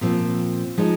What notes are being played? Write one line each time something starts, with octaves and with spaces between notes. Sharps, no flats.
A#2 F3 C4
F3 G#3 D#4